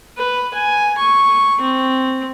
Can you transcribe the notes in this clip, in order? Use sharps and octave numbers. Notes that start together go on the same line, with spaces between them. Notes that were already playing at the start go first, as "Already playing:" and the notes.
B4
G#5
C#6
C4